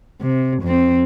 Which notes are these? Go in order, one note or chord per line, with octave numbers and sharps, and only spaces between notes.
C3
F2 C4